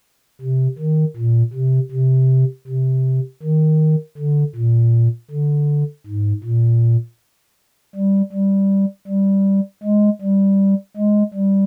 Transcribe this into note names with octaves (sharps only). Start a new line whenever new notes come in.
C3
D#3
A#2
C3
C3
C3
D#3
D3
A#2
D3
G#2
A#2
G3
G3
G3
G#3
G3
G#3
G3